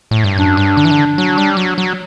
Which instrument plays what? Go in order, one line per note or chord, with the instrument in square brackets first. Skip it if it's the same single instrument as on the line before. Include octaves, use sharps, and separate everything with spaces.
[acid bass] A2
G2
[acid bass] F#2 [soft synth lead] D4
[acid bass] G2
D3
E3
D3
F#3
G3
F#3
F#3